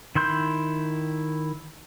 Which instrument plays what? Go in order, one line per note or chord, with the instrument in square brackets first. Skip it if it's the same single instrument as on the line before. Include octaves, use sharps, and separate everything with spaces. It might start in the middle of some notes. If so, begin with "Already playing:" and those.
[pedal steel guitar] D#3 E4 C6 G6